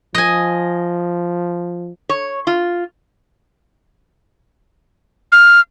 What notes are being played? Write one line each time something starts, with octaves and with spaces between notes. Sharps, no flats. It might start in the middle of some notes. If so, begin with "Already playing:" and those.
F3 D#5 G#5
C#5
F4
F6